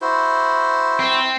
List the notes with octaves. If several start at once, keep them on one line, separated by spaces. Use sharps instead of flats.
E4 F#4 C5
C4